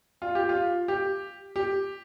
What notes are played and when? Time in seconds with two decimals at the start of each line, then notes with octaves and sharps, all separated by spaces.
0.22 F4
0.35 G4
0.49 F4
0.88 G4
1.56 G4